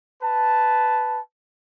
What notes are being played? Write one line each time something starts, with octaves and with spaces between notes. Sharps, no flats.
B4 A5